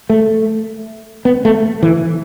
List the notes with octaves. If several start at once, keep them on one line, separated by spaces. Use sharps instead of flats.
A3
B3
A3
E3